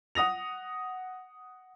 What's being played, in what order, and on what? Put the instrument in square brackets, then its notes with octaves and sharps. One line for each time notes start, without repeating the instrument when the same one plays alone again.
[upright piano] F#5 D#6 A#6 F7